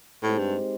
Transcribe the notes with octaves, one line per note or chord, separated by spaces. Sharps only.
A2 G#3 C4 D#4 G4 C5
G2